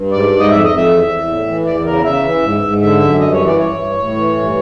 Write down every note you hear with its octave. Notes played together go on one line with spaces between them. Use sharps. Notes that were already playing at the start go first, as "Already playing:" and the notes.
Already playing: G2
G#2 D5
G#2
D#5
F2 E5
D#5
F2
E5
E2
E2
A2
E3
E2 D5
C#3 A#4
C#3 E5
E3
G#2
G#2
D3 E5
F#2
G2 D#5
C#5
E3
D5
G2 C#5
G2
A2
E3
G2